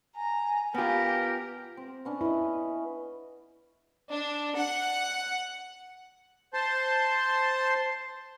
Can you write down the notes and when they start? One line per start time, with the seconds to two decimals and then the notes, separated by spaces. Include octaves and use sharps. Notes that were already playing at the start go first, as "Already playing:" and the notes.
0.16 G#5 A#5
0.74 B3 F4 G4 A#4
1.77 C4
2.05 B3 C#4 D4
2.21 E4 B4 D#5
4.11 D4
4.57 F#5
6.54 C5 A5 C6